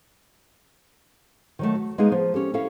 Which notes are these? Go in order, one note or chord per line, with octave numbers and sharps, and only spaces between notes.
D#3 F#3 A3
F#4
G#3 A#3 B3 D#4 G#4
F3
C#4 G4 A4
C#4 E4 A4 F5